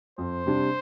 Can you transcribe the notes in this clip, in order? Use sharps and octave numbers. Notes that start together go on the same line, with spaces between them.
F2 C5
C3 G3 D4